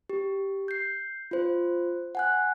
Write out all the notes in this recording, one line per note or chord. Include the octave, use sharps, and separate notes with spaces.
G4
G6 C7
F4 C5
F#5 G#5 F#6